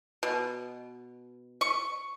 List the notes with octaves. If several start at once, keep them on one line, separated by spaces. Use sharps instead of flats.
B2
C#6